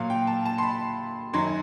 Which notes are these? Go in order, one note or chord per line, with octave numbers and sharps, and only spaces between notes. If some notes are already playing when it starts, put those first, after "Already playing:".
Already playing: A#2 F#3 F5
G5
A5
A5
C6
B5
F#2 D#3 F#3 C6